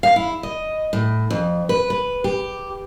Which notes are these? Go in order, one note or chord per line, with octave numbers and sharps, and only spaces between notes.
F5
E4
D#5
A2
F2
B4
B4
G4